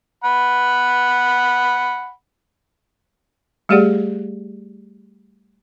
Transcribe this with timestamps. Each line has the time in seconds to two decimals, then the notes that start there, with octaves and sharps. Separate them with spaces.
0.24 F#5 B5
3.69 G3 A3 G4 G#4 D5 F#5